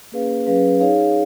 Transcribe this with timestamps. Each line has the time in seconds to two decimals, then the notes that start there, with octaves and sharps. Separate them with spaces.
0.12 A#3 C#4 G#4 B4 F5
0.46 F#3 C#4 G#4 B4 F5
0.80 D#4 G#4 C#5 F5